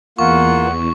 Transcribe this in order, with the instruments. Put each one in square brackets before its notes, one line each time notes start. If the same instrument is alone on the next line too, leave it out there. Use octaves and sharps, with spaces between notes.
[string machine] E2 [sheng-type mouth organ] A#3 F4 [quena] F#5 [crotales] C#6